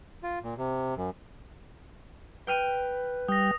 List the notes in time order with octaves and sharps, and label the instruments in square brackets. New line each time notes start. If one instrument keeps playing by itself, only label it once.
[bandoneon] F4
A#2
C3
F#2
[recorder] B4 [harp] G5 F6 D#7
[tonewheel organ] G3 G5 [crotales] D#6 A#6